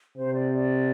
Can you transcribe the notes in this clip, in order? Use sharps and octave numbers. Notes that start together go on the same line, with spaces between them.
C3 C5
D5
D5